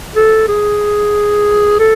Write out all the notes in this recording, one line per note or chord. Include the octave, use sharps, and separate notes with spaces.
A4
G#4
A4